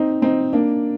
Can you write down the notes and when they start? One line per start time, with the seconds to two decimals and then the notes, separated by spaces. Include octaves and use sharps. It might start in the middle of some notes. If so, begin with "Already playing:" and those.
Already playing: C4 D#4
0.22 C4 D#4
0.53 A#3 D4